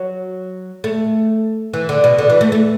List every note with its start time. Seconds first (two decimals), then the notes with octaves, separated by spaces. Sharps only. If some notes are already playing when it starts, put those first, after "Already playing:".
Already playing: F#3
0.84 A3
1.74 E3
1.89 D3
2.04 B2
2.18 D3
2.30 E3
2.41 A3
2.52 A3